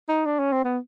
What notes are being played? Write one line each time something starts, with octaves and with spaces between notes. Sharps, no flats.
D#4
D4
C#4
C4
B3